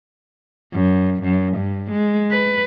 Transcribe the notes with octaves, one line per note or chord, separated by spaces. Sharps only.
F#2
F#2
G2
G#3
B4